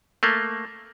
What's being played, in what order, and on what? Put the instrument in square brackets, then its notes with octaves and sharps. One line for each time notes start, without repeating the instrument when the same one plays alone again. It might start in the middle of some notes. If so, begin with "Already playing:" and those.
[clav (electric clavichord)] A3 A#3